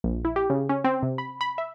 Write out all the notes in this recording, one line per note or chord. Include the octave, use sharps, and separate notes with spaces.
A#1
E4
G4
C#3
C#4
C4
C3
B5
B5
E5